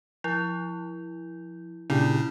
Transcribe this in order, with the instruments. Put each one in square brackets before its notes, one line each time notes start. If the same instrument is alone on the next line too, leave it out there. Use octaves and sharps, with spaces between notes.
[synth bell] F3 E4
[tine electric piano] A#2 D4 G4 [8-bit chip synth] C#3 [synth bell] E4